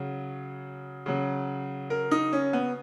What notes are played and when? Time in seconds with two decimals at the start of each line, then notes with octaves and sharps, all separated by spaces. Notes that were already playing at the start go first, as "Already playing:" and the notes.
Already playing: C#3 F#3
1.06 C#3 F#3
1.90 A#4
2.11 D#4
2.33 C#4
2.53 B3